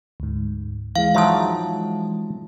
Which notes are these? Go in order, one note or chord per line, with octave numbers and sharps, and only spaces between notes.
D2 G#2
E3 G#3 F5
F3 F#3 D#4 E5 A5